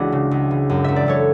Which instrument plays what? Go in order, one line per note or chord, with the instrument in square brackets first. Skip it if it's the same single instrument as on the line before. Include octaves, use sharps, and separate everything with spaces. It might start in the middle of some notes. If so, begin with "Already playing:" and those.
Already playing: [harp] C#2 E3 D4 E4 F#4 G#4
C#3
C#2
E3
F#2
F#2 E5
D5
F#2 A4 C#5